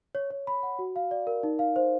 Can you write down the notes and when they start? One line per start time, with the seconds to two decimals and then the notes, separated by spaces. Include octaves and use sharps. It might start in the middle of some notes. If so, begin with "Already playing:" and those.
0.15 C#5
0.31 C#5
0.47 B5
0.63 F#5
0.79 F#4
0.96 F5
1.11 D5
1.27 A#4
1.43 D#4
1.59 F5
1.76 C5